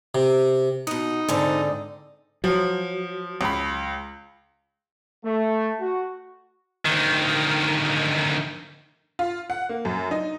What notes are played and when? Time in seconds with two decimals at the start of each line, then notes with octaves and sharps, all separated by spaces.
0.15 C3
0.87 B2 D#4 F#5
1.28 G#2 D3 C4 D5
2.44 F3 F#3
3.41 C#2 B5
5.24 A3
5.80 F#4
6.85 D2 D#3
9.19 F4
9.50 F#5
9.69 A#3
9.85 F#2
10.11 D#4